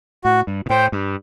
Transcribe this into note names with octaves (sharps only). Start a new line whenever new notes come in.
A2 F#4
G2
B2
A2 C5 G5
G2